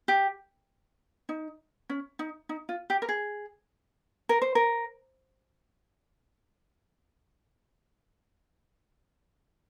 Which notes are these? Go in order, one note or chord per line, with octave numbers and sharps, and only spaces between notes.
G4
D#4
C#4
D#4
D#4
F4
G4
A#4
G#4
A#4
C5
A#4